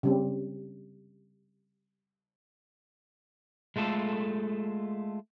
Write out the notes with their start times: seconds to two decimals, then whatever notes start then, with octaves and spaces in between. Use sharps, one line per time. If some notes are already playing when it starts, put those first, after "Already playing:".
0.03 C#3 G3 C4
3.76 G#3 A3 F4 A4